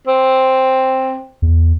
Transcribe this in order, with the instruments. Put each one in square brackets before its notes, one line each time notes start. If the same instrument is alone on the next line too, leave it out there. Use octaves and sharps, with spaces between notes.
[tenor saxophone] C4
[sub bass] E2